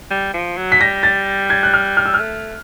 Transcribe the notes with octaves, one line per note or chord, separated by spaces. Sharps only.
G3
F3
F#3
B6
G3 A#6
A6
G#6
F#6
F6
F6
E6
F6
A3